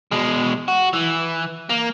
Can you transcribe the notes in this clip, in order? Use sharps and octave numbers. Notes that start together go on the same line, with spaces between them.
B2 G#3
F#4
E3
A#3